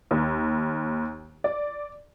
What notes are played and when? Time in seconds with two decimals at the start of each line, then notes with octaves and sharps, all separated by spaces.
0.11 D#2
1.44 D5